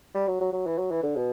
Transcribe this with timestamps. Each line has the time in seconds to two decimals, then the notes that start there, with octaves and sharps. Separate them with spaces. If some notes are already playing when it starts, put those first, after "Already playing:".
0.14 G3
0.27 F#3
0.41 F#3
0.52 F#3
0.66 E3
0.78 F#3
0.90 E3
1.03 D3
1.16 B2